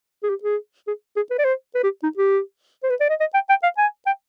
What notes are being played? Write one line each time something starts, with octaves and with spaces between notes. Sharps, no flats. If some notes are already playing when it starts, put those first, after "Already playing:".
G#4
G4
G#4
G#4
G#4
B4
D5
C5
B4
G4
D#4
G4
C5
B4
D5
D#5
D#5
G5
G5
F5
G#5
G5